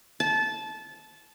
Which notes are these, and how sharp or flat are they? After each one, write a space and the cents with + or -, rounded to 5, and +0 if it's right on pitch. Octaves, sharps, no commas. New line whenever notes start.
A5 -20